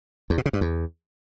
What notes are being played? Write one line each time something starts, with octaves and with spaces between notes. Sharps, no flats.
E2
B2
C#3
G2
E2